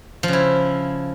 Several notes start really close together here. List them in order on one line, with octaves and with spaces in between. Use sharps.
F3 C#3 E4